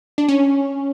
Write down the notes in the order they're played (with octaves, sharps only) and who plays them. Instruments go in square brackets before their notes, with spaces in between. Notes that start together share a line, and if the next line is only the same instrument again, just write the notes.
[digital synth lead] D4
C#4